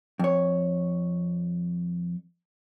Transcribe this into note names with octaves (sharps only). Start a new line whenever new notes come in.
F2 C#5